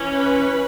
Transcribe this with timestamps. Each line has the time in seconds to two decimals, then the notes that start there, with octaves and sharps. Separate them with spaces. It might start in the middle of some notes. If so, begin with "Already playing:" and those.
Already playing: E3 C#4
0.14 B4